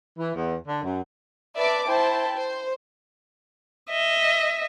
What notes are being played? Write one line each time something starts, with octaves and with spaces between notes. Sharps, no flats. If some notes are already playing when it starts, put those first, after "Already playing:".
E3
E2
D3
F#2
B4 D5 E5 A5 D6
E4 C5 G5 A5
C5
D#5 E5